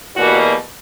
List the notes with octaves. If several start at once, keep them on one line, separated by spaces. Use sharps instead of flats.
E2 B2 G3 A#3 F#4